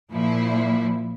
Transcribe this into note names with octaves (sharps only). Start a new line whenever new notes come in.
A#2 F3 E4